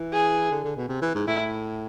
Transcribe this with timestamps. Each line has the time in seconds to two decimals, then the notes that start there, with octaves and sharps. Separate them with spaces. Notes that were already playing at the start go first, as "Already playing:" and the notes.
Already playing: E3
0.13 G#4
0.51 D3
0.64 D3
0.76 B2
0.89 C3
1.02 E3
1.15 G#2
1.27 A2 E4